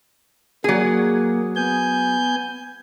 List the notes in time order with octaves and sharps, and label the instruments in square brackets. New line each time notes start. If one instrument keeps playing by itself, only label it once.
[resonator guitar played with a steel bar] F#3 G#4 [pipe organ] A#3
[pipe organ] B3 G#5 G6